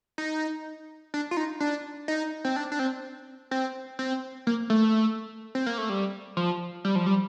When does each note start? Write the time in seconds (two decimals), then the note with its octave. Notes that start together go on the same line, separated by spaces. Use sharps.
0.18 D#4
1.14 D4
1.31 F4
1.37 D#4
1.60 D4
2.08 D#4
2.45 C4
2.56 D4
2.72 D4
2.79 C4
3.51 C4
3.99 C4
4.47 A#3
4.70 A3
5.55 C4
5.66 A#3
5.78 A3
5.89 G3
6.37 F3
6.85 G3
6.96 F3
7.06 G3